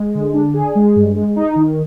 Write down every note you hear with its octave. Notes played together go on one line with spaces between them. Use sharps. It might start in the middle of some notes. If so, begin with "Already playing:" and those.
Already playing: G#3
D3
D4
G#4
G#3
G2
G#3
D#4
D#3